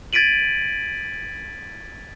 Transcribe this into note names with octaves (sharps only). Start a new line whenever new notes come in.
G#6 A6 B6 D7 D#7 F#7